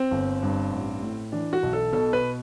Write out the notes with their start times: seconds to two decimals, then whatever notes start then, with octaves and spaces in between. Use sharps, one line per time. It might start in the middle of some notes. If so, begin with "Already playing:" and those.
Already playing: C4
0.11 G1
0.43 G2
0.73 A1
1.03 A2
1.32 E3 D4
1.53 F#4
1.63 B1
1.73 A4
1.92 B2 A4
2.13 B4